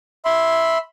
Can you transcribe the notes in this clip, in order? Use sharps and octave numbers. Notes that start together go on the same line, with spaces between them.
E5 B5 C6